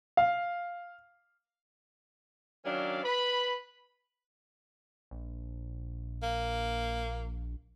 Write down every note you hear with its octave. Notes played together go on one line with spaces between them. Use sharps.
F5
D#3 F#3 C#4 D4 D5 F5
B4 B5
A#1
A#3